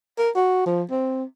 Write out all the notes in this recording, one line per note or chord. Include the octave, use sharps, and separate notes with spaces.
A#4
F#4
F3
C4